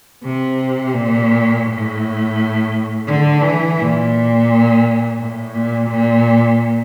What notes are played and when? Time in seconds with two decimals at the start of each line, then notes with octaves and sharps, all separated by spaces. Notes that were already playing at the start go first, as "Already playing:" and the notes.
0.24 C3
0.94 A#2
1.66 A2
3.07 D3
3.41 E3
3.78 A#2
5.19 A2
5.54 A#2
5.90 A#2